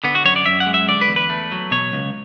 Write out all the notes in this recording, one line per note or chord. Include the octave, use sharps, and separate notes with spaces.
D3 B3
F#4
F#2 C#5
D5
F#2 E5
F#5
G#3
E5
D3 D5
B4
E2
B4
A3
F#3
B2 C#5
C#2